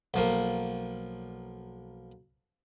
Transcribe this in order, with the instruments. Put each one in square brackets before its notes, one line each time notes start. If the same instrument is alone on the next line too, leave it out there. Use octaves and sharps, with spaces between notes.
[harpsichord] B1 F3 A#3